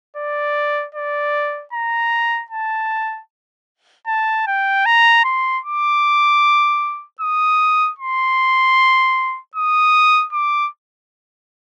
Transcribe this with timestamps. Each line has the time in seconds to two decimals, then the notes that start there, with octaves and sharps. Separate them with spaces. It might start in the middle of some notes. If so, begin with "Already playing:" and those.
0.17 D5
0.95 D5
1.73 A#5
2.51 A5
4.07 A5
4.47 G5
4.86 A#5
5.25 C6
5.64 D6
7.21 D#6
7.99 C6
9.55 D#6
10.33 D6